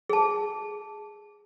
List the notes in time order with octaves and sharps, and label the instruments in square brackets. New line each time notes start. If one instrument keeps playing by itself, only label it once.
[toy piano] G#4 A5